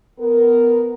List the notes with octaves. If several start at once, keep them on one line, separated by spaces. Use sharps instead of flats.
B3 A#4